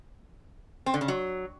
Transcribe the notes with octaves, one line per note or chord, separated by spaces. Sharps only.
C4
D3
C#3
F#3